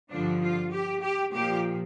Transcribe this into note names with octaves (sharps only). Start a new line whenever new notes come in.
G2 D3 F3 D4
F4
G4
G4
A#2 F3 G4